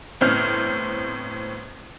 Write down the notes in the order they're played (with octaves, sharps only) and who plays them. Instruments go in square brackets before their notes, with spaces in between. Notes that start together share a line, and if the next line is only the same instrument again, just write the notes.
[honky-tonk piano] G1 A2 C4 C5 F6